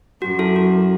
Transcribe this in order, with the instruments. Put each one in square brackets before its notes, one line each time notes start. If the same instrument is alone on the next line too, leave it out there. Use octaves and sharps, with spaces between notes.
[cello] F#2 [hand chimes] F#4
[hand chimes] E4 A4
F#4